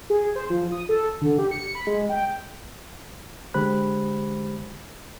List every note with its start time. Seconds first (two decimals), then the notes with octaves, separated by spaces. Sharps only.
0.10 G#4
0.36 C5
0.50 F3
0.72 D#6
0.89 A4
1.21 D3
1.38 G4
1.51 C#7
1.75 B5
1.87 G#3
2.09 G5
3.54 D3 G#3 G4 C5 B5 F#6